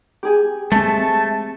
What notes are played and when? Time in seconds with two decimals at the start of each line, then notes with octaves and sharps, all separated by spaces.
0.23 G4 G#4 G#5
0.72 G#3 A3 C4 A5